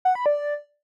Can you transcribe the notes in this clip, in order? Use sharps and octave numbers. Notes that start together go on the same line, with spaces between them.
F#5
B5
D5